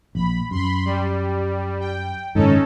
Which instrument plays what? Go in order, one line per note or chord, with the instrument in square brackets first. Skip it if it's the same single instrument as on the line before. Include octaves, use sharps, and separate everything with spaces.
[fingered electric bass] A#1 [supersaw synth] B5
[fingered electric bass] F#2 [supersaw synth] B5 C6
[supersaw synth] G3
G5
[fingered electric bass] F#1 G#2 D#3 [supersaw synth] C#4 D#4 A4